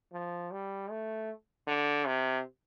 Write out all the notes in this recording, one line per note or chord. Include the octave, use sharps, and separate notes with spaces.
F3
G3
A3
D3
C3